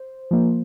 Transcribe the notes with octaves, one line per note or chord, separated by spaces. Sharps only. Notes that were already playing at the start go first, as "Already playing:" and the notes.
Already playing: C5
F3 A#3